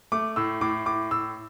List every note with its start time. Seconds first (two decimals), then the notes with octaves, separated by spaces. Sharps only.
0.12 A3 D6
0.36 A2 E6
0.61 A2 D6
0.86 A2 D6
1.11 A2 E6